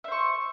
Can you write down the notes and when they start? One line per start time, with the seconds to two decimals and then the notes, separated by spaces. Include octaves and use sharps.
0.04 E5
0.08 C5
0.12 C#6